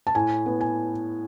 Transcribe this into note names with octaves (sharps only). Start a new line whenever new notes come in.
A5
A2 G#5
B3
G#5